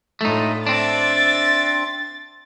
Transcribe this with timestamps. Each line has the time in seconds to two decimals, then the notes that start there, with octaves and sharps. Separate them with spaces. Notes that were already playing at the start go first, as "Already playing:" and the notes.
0.21 A2 A3 D4 D#4 F4
0.67 C4 D4 E5 C6 A6